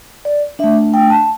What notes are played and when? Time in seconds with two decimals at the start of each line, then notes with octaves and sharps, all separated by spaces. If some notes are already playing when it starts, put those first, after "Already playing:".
0.25 D5
0.59 A3 D4 E5
0.94 G5
1.10 A5